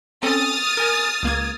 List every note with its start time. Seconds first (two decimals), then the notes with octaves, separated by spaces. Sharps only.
0.23 C4 C#4 A4 D#6 F6 A6
0.77 A#4 G#5
1.23 C#2 A#3 G#6